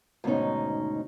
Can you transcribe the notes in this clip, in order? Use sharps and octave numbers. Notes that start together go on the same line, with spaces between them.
D2 G#2 B2 D#3 C#4 D#4